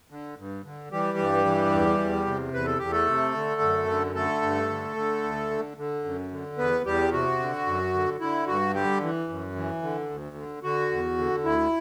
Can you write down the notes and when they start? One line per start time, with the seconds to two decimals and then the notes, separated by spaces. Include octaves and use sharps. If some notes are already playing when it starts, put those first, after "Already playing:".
0.10 D3
0.37 G2
0.64 D3
0.91 E3 G3 G4
1.18 G2
1.46 E3
1.72 E2
1.99 E2
2.26 C3
2.54 E2 B4
2.65 A4
2.79 E2 G4
2.91 A3 A4
3.07 C3
3.34 D3
3.61 F#2
3.88 D3
4.15 D3 A3 A4
4.42 G2
4.69 D3
4.96 D3
5.23 D2
5.51 D3
5.77 D3
6.04 F#2
6.31 D3
6.58 E2 B3 B4
6.85 E2 G3 G4
7.12 C3 F#4
7.40 D3
7.66 F#2
7.94 D3
8.20 D3 E4
8.47 G2 F#4
8.74 D3 G3 G4
9.02 E3
9.29 F#2
9.56 E3
9.82 D3
10.10 D2
10.36 D3
10.63 D3 F#4
10.91 E2
11.18 D3
11.44 D2 E4